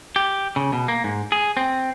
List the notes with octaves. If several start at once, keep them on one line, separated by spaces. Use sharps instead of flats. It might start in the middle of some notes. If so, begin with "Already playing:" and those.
G4
C#3
B2
A#3
G#2
G#4
C4